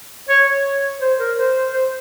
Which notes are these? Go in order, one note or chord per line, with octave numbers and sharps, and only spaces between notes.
C#5
C#5
C5
A#4
C5
C5